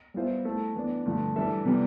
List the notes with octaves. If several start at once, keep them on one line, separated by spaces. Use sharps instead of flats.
G3 B3 F4 C5 E5
A3 E4 A4
E3 B3 D4
G2 D3 F3 A3
E3 G3 D4 A4 E5
C3 E3 G3 B3